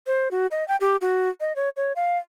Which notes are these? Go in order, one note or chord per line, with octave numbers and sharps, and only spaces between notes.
C5
F#4
D#5
G5
G4
F#4
D#5
C#5
C#5
F5